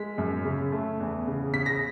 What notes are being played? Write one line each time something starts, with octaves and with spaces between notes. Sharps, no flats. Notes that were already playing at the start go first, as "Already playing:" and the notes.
Already playing: G#3 B6
F#2
C#3
A3
E2
C#3
C#3 B6
A#6